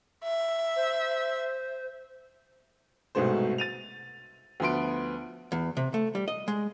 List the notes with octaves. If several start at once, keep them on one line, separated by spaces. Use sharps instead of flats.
E5
C5
C2 G#2 B2 A3 C5
A6 D#7 F7
D2 F3 B3 C6 D7
E2
C3
A3
G3
D#5
G#3